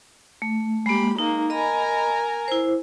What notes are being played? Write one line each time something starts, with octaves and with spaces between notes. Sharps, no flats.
A3
G#3 A#3 G4 B5
G#3 A#3 D#4
A#4 D#5 G#5 A#5 B5
E4 C5